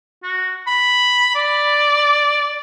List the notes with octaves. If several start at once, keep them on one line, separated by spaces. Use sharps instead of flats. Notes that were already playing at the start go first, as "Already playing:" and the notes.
F#4
B5
D5